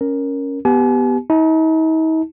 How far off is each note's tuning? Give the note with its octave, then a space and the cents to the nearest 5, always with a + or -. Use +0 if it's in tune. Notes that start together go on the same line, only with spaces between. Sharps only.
C#4 +0 A#4 +0
B3 +0 G4 +0 G#5 +45
D#4 +45 A5 +0